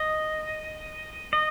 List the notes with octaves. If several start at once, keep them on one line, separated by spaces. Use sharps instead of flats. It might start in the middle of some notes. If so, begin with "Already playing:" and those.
Already playing: D#5
D#5